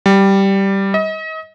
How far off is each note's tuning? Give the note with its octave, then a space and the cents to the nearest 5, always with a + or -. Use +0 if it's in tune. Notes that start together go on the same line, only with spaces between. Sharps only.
G3 -5
D#5 +35